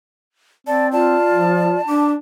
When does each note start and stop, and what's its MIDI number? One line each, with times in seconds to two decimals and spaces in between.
0.67 1.16 60
0.67 0.91 74
0.67 0.87 81
0.93 1.77 65
0.93 1.82 74
0.93 2.13 81
1.31 1.75 53
1.88 2.15 62
1.88 2.10 86